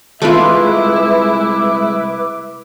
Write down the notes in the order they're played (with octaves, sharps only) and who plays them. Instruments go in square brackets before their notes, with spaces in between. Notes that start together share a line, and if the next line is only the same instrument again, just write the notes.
[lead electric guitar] C2 G#3 [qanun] A3 F4 [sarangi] E4 [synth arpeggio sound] B4 E5 D6